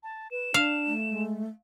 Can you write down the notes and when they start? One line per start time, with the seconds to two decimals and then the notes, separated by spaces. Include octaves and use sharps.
0.03 A5
0.31 B4 E7
0.54 D4 F5
0.86 A3
1.10 G#3